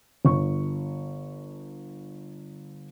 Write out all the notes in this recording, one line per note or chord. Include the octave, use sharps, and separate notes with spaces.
G1 C#6